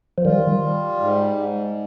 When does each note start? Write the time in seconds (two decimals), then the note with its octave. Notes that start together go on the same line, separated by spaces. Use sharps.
0.18 F3
0.25 D#3 G3 F4
0.62 G3
0.99 G#2
1.36 G#2